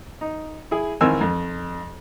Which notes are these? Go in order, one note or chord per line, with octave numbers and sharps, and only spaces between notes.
D#4
E4 G#4
G#1 E3 C4 A#4 G#5 E6
F2